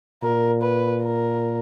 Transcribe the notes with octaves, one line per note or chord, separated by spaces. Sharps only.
A#2 A#4
B4
A#4